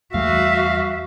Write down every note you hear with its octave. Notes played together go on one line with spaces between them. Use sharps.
E2 G3 A3 F#4 E5 F5